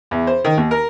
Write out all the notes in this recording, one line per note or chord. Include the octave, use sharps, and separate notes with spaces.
E2
C5
D#3
D#2
A#4